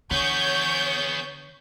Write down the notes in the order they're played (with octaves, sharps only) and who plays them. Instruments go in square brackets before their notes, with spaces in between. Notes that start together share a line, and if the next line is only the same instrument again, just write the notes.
[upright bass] D3 [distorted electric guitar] B3 G#4 [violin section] C#5 G6